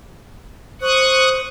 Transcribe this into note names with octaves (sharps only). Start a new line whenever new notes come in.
C5 C#6 D#6 F#6